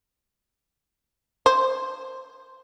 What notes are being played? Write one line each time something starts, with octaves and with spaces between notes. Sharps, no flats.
C5